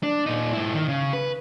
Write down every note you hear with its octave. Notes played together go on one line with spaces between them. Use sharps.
D4
A#2 D#4
G#2 E4
D#3
C#3
B4